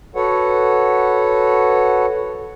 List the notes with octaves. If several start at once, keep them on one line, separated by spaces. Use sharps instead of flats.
F#4 A4 B4 C#5 F#5